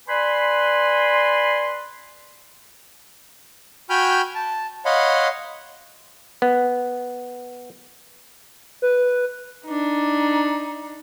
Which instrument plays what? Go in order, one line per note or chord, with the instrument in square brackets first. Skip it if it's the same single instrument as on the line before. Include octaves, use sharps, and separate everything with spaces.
[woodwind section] B4 D5 G#5 B5 C6
[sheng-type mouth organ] F#4 G5 G#5 B5 F6 G6
A5
C#5 D#5 F5 F#5 B5 C6
[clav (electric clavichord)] B3
[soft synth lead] B4
[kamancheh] D4 D#4